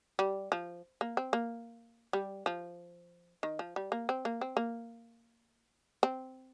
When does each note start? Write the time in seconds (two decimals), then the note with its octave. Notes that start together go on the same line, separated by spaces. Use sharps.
0.19 G3
0.52 F3
1.01 A#3
1.17 C4
1.33 A#3
2.13 G3
2.46 F3
3.43 D#3
3.59 F3
3.76 G3
3.92 A#3
4.09 C4
4.25 A#3
4.41 C4
4.57 A#3
6.03 C4